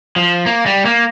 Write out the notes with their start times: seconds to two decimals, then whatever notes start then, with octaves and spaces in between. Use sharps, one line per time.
0.16 F3
0.46 A#3
0.66 G3
0.85 A#3